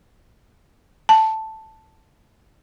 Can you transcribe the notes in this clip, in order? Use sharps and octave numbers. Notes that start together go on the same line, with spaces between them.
A5